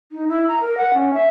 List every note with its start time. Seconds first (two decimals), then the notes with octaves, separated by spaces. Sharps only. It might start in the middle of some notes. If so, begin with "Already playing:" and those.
0.12 D#4
0.28 E4
0.48 A#5
0.61 A#4
0.78 F#5
0.94 C#4
1.14 E5